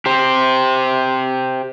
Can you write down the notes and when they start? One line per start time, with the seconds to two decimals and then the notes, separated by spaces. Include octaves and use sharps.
0.06 G4 C5